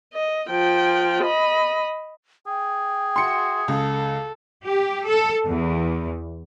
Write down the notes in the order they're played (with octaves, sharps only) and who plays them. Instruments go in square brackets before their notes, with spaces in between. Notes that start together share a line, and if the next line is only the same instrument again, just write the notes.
[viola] D#5
F3 G5
D#5 B5
[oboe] G#4 [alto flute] G5
[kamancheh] F#4 E5 [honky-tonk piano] C6 C#7
[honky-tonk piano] C#2 [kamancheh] A4
[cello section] G4
A4
E2